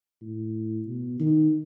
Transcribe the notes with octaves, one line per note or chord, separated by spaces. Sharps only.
A2
B2
D#3